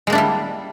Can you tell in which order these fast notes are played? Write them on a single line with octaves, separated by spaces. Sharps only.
G#3 A#3 D4 E4 G3